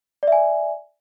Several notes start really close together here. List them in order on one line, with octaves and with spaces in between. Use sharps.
D5 E5 G#5